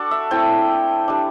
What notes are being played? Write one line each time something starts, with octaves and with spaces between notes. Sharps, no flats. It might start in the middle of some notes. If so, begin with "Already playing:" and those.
Already playing: D4 F#4 A4 D5
E5
A3 C4 E4 G5
G3 D4